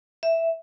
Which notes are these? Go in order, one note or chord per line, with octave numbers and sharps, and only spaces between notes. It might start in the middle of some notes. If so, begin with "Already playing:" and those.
E5